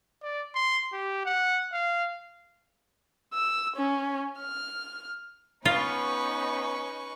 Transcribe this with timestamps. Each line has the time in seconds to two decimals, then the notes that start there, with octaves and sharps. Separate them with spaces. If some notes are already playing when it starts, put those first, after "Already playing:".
0.23 D5
0.55 C6
0.93 G4
1.25 F#5
1.73 F5
3.33 E6
3.76 C#4
4.40 F6
5.65 B3 C#4 D#4 F4 B4 C#6